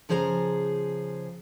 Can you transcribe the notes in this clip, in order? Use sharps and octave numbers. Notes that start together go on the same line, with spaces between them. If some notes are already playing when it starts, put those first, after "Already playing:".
C#3 F3 G#4 C5 F#5 A#5